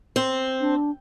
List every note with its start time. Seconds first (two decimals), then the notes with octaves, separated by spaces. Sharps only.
0.16 C4
0.60 D4